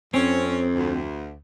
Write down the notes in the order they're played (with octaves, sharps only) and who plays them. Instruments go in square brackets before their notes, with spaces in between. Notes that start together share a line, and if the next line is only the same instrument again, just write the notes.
[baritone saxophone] F2 [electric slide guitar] C4 [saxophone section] C#4
[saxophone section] D2